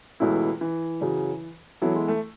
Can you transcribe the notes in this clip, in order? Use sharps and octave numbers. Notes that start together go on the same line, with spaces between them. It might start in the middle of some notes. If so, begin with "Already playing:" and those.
C#2 B2 E3 A3 E4
E3
F#2 C#3 F#3
E3 F#3 B3 E4 A4
G#3
A3